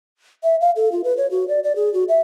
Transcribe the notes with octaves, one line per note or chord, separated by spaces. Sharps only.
E5
F5
A4
F4
B4
C#5
F#4
D5
D5
G#4
F#4
E5